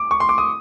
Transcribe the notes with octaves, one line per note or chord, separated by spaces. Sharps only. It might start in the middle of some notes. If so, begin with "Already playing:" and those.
Already playing: D6
C#6
C6
D6
D#6